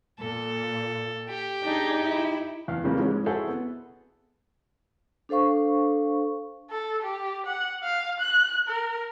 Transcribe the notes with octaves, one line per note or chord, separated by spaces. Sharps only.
A#2 A4
G4
D4 D#4 G#4
E4
E2 F5
C#3 E3 F3 G3 G#3 A#3
G#2 E3 F3 G#3 C#4
E4 F#4 G#4 A4 C5 E5
B3
D4 A4 C5 F5 C#6
A4
G4
F#5
F5
F#6
A#4